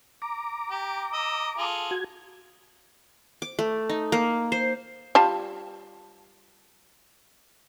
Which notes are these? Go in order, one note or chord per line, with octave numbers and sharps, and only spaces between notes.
A#5 D6
G4
D#5 E6
F4 G#4 A4
F#4 G#6
D6
A3
D#4
A#3
C5
G3 F4 A5